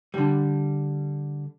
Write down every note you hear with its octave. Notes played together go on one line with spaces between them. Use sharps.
D3 G3